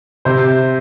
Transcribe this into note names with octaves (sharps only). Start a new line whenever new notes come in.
C3 C5